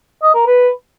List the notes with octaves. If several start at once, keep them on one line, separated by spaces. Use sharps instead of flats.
D#5
A#4
B4